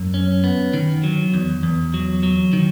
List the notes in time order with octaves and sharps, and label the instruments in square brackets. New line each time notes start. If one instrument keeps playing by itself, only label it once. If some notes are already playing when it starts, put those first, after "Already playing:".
Already playing: [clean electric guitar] F#2
C#4
B3
D#3
F#3
E2
E2
F#3
F#3
D#3